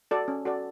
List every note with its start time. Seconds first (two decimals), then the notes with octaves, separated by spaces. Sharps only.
0.11 F#4 A4 D5
0.28 C#4
0.45 F#4 A4 D5